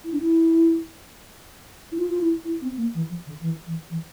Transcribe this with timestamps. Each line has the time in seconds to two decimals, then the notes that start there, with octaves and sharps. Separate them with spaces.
0.04 E4
0.12 D4
0.20 E4
1.92 E4
1.98 F4
2.10 F4
2.21 E4
2.45 E4
2.62 C4
2.77 A#3
2.94 E3
3.09 F3
3.26 D3
3.41 E3
3.66 E3
3.90 E3